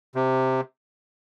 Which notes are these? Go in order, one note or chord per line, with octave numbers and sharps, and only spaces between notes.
C3